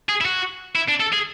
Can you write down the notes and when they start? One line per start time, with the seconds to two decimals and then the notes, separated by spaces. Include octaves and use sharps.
0.09 G#4
0.21 E4
0.26 F#4
0.76 E4
0.89 D4
1.01 A4
1.13 G#4